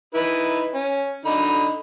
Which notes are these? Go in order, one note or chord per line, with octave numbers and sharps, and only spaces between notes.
D#4 E4 B4
C#4
D3 D#4 B5